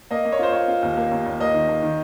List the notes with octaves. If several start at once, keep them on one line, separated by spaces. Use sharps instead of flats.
A#3 D#5
A#3
C#5
F4 C5
F4 C#5
F4
D#2
A#3
D#2
D#2
A#3 D#5
D#3
A#3
D#3